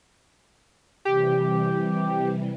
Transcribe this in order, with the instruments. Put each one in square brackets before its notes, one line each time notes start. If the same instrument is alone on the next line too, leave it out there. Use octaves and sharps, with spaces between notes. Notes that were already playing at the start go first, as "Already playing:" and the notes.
[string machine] C3 E3 G3 [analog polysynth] G4